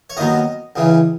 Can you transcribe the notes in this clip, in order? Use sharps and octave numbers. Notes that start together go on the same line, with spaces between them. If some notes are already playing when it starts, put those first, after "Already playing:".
C#5
D#2 D#3 F#3 B3 D#5
C#2 C#3 E3